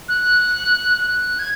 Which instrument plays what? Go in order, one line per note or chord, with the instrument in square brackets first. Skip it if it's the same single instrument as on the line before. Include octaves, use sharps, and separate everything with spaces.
[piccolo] F#6
F#6
G#6